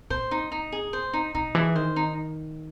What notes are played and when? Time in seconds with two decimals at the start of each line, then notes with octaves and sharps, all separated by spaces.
0.10 A#2 C5
0.31 D#4
0.52 D#4
0.72 G#4
0.93 C5
1.13 D#4
1.34 B2 D#4
1.55 E3 G#4
1.75 D#3 C5
1.96 D#4